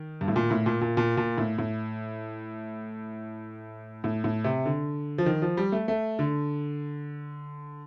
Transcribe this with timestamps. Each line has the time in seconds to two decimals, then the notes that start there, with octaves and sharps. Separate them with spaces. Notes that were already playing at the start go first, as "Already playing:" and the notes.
Already playing: D#3
0.21 G2
0.28 A2
0.36 A#2
0.50 A2
0.66 A#2
0.81 A#2
0.97 A#2
1.17 A#2
1.38 A2
1.58 A2
4.04 A2
4.24 A2
4.44 C3
4.66 D3
5.18 F3
5.26 D#3
5.42 F3
5.57 G3
5.72 A3
5.88 A3
6.19 D3